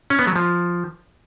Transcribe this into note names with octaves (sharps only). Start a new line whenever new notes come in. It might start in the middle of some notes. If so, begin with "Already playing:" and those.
C#4
B3
F#3
F3